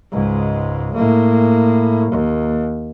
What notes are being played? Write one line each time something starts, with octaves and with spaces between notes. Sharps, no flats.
C#2 G#2
A2 A#3
D#2